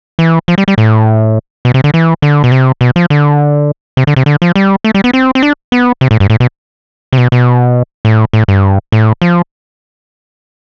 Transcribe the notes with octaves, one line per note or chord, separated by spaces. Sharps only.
E3
F3
G3
G3
A2
B2
C3
D3
E3
D3
B2
C3
B2
F3
D3
C3
D3
C3
D3
F3
G3
A3
G3
B3
C4
C4
D4
B3
C3
A2
G2
A2
B2
C3
B2
B2
A2
A2
G2
A2
F3